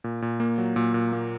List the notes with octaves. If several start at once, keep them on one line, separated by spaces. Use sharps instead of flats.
A#2
A#2
A#3
F#3
A#2
A#2
A#3